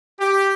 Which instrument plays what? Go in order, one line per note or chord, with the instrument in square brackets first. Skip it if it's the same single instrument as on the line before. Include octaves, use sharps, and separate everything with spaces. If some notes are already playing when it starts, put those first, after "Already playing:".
[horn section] G4